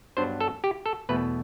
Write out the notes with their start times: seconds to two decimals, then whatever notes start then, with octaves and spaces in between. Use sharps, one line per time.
0.17 G2 F#3 B3 D4 C5
0.41 A4
0.64 G4
0.86 A4
1.09 E2 B2 A3 B4